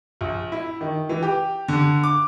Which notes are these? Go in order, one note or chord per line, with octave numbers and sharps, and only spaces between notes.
A#1
E4
D#3
E3
G4
D3
D6